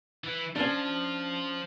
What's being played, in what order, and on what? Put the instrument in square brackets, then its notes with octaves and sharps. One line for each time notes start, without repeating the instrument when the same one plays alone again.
[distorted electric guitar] E3
[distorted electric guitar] F3 [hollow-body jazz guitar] C#4 D4